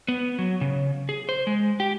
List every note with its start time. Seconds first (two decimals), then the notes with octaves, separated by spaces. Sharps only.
0.08 B3
0.39 F#3
0.61 C#3
1.09 G#4
1.29 C5
1.47 G#3
1.80 G4